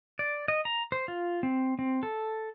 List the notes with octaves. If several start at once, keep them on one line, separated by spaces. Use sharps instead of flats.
D5
D#5
A#5
C5
F4
C4
C4
A4